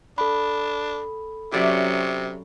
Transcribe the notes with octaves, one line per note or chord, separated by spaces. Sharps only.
D4 A4 B5
C3 F#3 C#4 G4 D5 E5